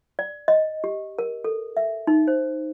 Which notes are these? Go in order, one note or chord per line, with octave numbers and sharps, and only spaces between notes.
D5
D#5
G4
A#4
A4
E5
D#4
C5